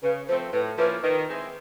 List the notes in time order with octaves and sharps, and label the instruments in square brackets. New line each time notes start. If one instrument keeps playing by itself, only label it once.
[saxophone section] C#3 [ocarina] B4
[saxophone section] F3 A3 C4 [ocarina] C5
[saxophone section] A2 [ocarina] B4
[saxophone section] F3 A#3 C#4 E4 [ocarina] B4
[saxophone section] D#3 [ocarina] B4
[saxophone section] G#3 C4 E4